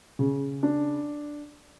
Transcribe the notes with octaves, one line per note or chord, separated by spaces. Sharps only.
C#3
D4